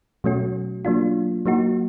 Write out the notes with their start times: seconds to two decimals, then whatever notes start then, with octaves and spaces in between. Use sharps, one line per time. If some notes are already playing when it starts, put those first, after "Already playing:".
0.24 B2 F#3 A3 C#4 F#4
0.85 F#3 A#3 D4 F4
1.46 F#3 A#3 D#4 F#4